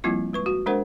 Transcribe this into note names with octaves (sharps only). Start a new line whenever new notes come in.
F3 G3 A#3 C4 E4 F4
G#3 B4 C#6
F#4
G#3 D4 A#4 C5 F#5